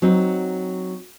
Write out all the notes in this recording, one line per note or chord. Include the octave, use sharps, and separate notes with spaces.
F#3 C4 D#4